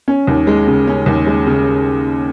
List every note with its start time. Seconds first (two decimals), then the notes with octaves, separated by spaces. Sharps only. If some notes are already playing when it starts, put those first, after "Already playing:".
0.08 C#4
0.27 D#2
0.47 G#3
0.67 C#3
0.88 C#4
1.06 D#2
1.26 G#3
1.47 C#3